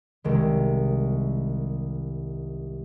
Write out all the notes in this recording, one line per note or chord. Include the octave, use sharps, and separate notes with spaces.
C2 D#3 G#3